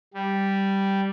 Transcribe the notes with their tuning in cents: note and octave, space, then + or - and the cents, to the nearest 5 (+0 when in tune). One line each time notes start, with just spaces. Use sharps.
G3 -5